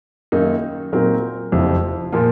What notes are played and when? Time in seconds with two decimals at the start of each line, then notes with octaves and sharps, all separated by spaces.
0.32 F#2 D#3 A#3 D#4
0.92 A#2 F#3 C4 D#4 A#4
1.52 F#1 F2 C3 F3
2.12 A#2 F3 A#3 F4